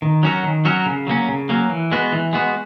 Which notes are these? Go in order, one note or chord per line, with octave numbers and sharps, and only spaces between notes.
D#3
F#3 C#4 F#4 A#4
D#3
F#3 C#4 F#4 A#4
C#3
F#3 A#3 C#4
C#3
F#3 A#3 C#4
E3
G#3 B3 F#4
E3
G#3 B3 F#4